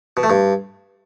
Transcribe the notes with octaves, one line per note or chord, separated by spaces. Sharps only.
B2
A3
G2